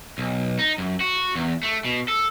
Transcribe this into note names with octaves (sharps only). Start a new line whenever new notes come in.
B1
D#4
F#2
F#4
E2
A3
B2
A4